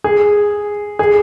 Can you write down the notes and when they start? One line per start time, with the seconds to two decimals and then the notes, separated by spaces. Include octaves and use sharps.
0.04 G#4
0.99 G#4